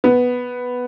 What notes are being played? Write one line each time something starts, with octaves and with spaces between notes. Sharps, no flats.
B3